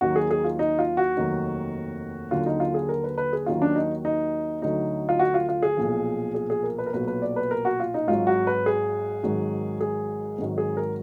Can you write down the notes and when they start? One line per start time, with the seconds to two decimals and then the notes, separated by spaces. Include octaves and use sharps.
0.01 D#2 D#3 F#3 F#4
0.16 G#4
0.31 G#4
0.44 F4
0.59 D#4
0.79 F4
0.97 F#4
1.17 F1 D#2 D#3 F#3
2.31 D#2 D3 F#3 F4
2.46 D#4
2.60 F4
2.74 G#4
2.89 A#4
3.04 B4
3.18 B4
3.33 G#4
3.46 D#2 D#3 F#3 F4
3.62 D4
3.75 D#4
4.05 D#4
4.62 D2 D3 F#3 D#4
5.09 F4
5.19 F#4
5.34 F4
5.49 F4
5.63 G#4
5.77 B1 A#2 F3
6.35 G#4
6.50 G#4
6.63 A#4
6.78 B4
6.86 A#4
6.93 B1 A#2 F#3 B4
7.07 B4
7.22 D5
7.36 B4
7.51 A#4
7.65 F#4
7.80 F4
7.94 D#4
8.08 G#1 G#2 F#3 F4
8.27 F#4
8.47 B4
8.66 G#4
9.23 G#1 G#2 D#3 F#3
9.81 G#4
10.38 G#1 G#2 D#3 F#3
10.58 G#4
10.77 A#4